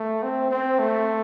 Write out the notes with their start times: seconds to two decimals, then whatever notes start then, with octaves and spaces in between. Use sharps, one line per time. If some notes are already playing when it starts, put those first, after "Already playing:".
Already playing: A3
0.23 C4
0.51 C4
0.79 A3